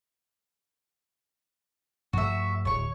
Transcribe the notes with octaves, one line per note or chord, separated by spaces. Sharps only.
G2 F3 A3 F#4 E5
D1 C#5 C#6